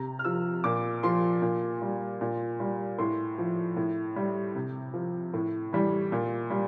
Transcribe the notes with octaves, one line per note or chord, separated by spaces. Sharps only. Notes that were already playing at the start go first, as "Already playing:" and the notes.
Already playing: C3 A#5
F6
F3 E6
A#2 D6
F3 C6
A#2
G3
A#2
G3
A2 C6
F3
A2
G3
C3
F3
A2
E3 G3
A#2
G3